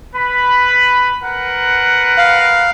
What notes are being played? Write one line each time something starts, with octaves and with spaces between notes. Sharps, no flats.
B4 B5
A#4 B4 F#5
F5